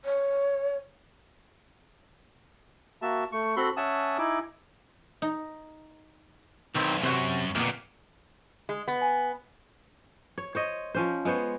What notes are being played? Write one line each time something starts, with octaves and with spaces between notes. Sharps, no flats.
C#5
A#3 F#4 E5 A5
A3 C#6
C4 F#4 A4 B5 C6
C#4 E5 F#5 G#5 A5 D#6
D#4 E4 G#5 D6
D#4
B1 D#3 C4 E4
F#2 C3 F#4 B4 C5
F2 A#2 A#3 B3
G#3
B3
G#5
C#5
C5 C#5 D#5
F3 C#4 C5
G#3 B3 C5 C#5